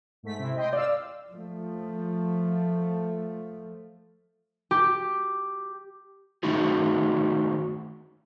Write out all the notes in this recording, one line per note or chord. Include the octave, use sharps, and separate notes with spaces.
G#2 A3 B6
C3 C4 E4
D#5 G5 C6
D5 F5 E6
F3 A3
G4
D#3 A3 D#4 F#4 G#4